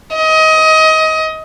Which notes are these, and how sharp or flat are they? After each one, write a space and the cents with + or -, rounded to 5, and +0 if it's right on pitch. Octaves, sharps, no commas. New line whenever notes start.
D#5 +25